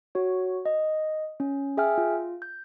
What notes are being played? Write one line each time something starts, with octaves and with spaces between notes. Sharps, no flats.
F#4 C#5
D#5
C#4
G#4 E5 G5 G#5 F6
F4
G6